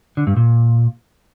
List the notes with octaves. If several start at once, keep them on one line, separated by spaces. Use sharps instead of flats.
D3
G2
A#2